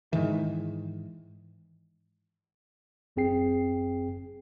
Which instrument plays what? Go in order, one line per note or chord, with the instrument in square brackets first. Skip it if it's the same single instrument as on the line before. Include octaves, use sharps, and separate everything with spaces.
[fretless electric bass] G#2 D#3 E3
[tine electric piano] G1 F#2 C4 G#4 G5 C7